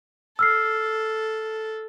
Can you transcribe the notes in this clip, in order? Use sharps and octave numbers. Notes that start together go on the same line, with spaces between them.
A4 E6 F6 C7